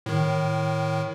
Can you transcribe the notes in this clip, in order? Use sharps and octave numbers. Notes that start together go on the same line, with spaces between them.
A2 D#3